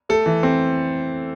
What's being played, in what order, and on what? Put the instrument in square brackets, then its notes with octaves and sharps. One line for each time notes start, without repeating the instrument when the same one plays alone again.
[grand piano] A3 A4
E3
C4